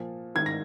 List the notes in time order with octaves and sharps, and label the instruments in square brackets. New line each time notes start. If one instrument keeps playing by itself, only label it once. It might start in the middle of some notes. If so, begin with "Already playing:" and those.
Already playing: [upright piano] A#2 F3
G#2 D#3 G#6
A#6